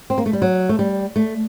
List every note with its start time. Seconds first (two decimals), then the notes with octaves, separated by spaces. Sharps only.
0.10 C4
0.18 A#3
0.26 A3
0.33 G3
0.42 F#3
0.69 A3
0.79 G3
1.16 A3